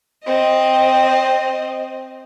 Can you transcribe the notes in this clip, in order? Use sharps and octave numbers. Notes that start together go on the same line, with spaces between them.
C4 D#5